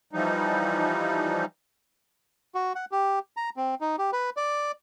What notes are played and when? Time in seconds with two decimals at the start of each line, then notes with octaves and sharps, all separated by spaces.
0.13 E3 F3 G3 D#4
2.55 F#4
2.75 F#5
2.92 G4
3.37 A#5
3.57 C4
3.81 D#4
3.98 G4
4.13 B4
4.37 D5